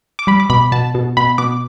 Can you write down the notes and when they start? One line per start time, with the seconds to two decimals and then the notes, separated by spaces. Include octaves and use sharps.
0.19 D6
0.27 G3 B5
0.40 D6
0.50 B2 B5
0.72 B2 A5
0.94 B2
1.17 B2 B5
1.38 B2 D6